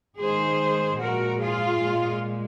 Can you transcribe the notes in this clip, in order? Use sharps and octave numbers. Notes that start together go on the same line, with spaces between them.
D#3 G#3 G#4 C5
A#2 F3 G#3 F#4 A#4
F4 G#4
A#2 G#3